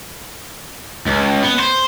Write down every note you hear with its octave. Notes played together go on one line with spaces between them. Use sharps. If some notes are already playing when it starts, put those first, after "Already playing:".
C#2
B3
C5